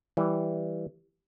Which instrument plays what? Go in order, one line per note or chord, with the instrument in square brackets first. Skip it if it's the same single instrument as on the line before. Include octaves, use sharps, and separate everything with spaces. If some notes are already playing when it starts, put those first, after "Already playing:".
[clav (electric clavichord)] E3 G3